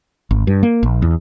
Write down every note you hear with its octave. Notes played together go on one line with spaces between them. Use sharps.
G#1
G2
A#3
A#1
E2